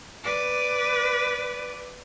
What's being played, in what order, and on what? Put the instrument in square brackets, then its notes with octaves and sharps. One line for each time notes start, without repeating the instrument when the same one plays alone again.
[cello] B4 D5